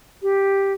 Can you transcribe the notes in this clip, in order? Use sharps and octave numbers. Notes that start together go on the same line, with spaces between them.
G4